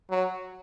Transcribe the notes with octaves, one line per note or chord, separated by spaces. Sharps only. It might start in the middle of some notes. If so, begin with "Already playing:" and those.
F#3